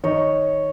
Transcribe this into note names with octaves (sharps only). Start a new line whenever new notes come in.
D#3 D#4 C#5